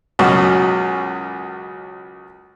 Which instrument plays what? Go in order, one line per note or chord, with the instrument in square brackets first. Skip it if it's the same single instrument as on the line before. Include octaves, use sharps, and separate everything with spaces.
[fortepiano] C#2 F#2 B2